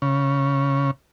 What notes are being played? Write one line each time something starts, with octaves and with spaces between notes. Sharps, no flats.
C#3